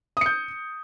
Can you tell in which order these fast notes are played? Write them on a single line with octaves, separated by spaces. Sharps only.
D#6 C#7 G6